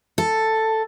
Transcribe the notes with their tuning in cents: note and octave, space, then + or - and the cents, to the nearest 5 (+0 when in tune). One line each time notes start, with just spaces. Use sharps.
A4 +5